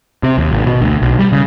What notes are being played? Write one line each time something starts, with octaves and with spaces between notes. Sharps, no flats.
C3
D#2
G#1
B2
D2
B1
G3
C#3